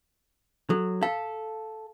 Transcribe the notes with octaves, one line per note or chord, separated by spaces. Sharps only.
F#3 A4
A4 F5